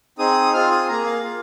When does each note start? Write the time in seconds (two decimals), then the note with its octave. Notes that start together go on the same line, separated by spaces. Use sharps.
0.19 C4 D#4 G#4 D#6
0.53 C4 F4 G#4 F6
0.71 D#6
0.89 A#3 G#4 A#5
1.06 F5
1.24 A#3 F4 G#4